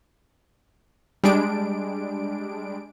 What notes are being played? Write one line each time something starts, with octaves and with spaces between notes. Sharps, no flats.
G3 G#3 D4 D7